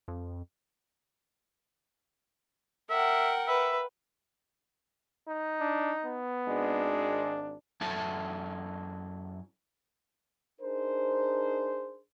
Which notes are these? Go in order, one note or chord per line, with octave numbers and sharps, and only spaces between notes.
F2
A#4 E5 F#5 G5
B4 E5
D#4
D4
B3
G#1 G#3 D4
F#2 E4 A4 A5
D4 D#4 G#4 A#4 C5